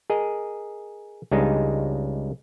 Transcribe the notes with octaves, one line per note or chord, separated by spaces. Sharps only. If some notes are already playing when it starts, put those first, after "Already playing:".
G#4 A#4 D#5
C#2 G3 G#3 D4 D#4